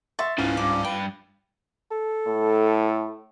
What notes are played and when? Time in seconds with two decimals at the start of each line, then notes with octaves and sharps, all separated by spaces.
0.19 E5 C6 C#6 A6
0.38 C#2 G#2 C#3 E3 C#4 F4 F5
0.57 G2 D6
0.85 G2 B4 G5
1.91 A4
2.27 A2